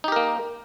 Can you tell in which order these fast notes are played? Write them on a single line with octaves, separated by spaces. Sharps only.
D#4 G4 A#4 A#3